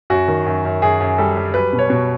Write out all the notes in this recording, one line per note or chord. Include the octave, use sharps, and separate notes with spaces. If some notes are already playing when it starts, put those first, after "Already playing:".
F#2 F#4
D#3
F#2
F#2
F#2 G#4
F#2
G3 A4
G3
F#3 B4
B2
C#5
B2